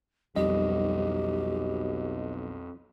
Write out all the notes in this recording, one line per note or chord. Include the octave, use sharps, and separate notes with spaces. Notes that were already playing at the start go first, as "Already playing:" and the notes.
B1 F2 G3 C4 G4 D#5